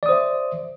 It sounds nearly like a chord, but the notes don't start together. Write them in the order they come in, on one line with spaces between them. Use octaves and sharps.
D5 D#6 C5 E5